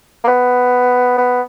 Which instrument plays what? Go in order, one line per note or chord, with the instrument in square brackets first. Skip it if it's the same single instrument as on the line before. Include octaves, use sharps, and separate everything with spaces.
[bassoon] A#3
B3
B3